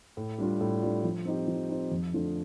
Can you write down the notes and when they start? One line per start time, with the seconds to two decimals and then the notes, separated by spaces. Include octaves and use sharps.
0.17 A2
0.38 G3 D4 F4
0.61 A2
0.82 G3 D4 F4
1.04 F3
1.25 C4 D#4 G4
1.48 F3
1.69 C4 D#4 G4
1.92 F2
2.13 D3 F3 A3 D4